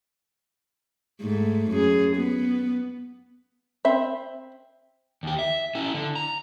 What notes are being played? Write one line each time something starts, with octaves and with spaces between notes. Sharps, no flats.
G#2 A3
F#2 G#4
B3
C4 E5 B5
D#2 G4
E5
C#4 E4
D3
A#5